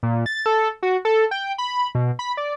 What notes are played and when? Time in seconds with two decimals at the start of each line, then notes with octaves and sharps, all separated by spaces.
0.03 A#2
0.26 A6
0.46 A4
0.83 F#4
1.05 A4
1.31 G5
1.58 B5
1.95 B2
2.19 B5
2.37 D5